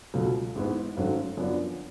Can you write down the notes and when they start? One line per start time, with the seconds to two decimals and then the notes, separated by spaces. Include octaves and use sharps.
0.14 C#2 B2 F#3 A3 F4
0.55 A1 G#2 G#3 B3
0.97 G#1 G#2 F#3 A3 C#4
1.37 F#2 D3 F3 B3 D4